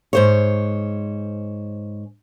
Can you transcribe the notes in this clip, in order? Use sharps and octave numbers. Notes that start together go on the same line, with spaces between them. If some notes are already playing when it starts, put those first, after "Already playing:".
G#2 C5 C#5